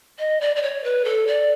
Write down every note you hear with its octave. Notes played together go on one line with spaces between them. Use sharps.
D#5
D5
D5
C#5
B4
A4
D5